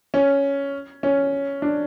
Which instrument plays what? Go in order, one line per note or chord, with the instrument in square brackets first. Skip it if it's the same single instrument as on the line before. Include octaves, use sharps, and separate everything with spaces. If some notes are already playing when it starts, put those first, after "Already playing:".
[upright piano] C#4
C#4
D4